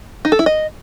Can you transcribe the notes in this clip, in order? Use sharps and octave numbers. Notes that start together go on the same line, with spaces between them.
D#4
A4
E4
D#5